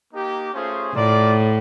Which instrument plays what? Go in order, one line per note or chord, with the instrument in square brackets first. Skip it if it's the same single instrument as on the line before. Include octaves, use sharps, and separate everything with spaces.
[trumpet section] A#3 D#4 G4
A3 C#4 F4 G#4 C5
[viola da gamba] A2 [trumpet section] F4 A#4 D5